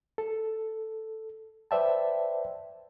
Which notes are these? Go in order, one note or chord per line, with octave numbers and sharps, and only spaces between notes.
A4
B4 C5 D5 E5 G5 A5